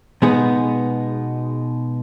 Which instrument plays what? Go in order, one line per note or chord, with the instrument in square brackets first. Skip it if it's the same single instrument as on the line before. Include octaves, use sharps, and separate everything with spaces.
[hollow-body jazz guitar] B2 G#3 B3 D#4 G#4